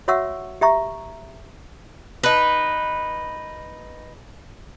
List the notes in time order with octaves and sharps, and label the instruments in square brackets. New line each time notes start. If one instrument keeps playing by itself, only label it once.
[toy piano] F#4 C#5 E5 F#5 C#6 E6
G4 E5 A#5 C#6
[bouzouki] D#4 B4